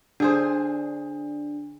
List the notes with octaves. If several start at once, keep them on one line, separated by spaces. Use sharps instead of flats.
D3 D4 G#4 C5